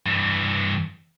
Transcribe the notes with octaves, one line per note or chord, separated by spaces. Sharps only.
G2 E3